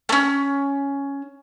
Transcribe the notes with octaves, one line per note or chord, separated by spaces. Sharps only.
A3 C#4